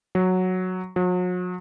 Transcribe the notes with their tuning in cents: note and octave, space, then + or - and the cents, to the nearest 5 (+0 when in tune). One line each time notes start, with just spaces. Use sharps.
F#3 -5
F#3 -40